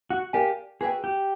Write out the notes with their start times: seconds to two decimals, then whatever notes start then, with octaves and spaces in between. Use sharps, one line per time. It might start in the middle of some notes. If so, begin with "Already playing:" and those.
0.10 F#4
0.33 G4 A#4 D5 F5 G#5
0.80 F#4 G#4 B4 E5 G5
1.04 G4